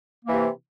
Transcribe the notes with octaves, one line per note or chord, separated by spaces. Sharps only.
C3 E3 A#3